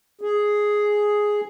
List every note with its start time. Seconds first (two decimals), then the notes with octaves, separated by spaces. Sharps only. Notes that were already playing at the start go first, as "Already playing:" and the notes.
0.21 G#4